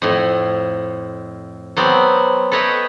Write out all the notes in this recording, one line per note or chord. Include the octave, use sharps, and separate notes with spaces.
F2 A2
F#3 B3 C4 D5
A4 B4 C#5 D#5 E5 G5